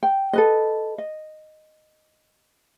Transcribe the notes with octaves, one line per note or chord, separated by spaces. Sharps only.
G5
A4 B4 D#5
D#5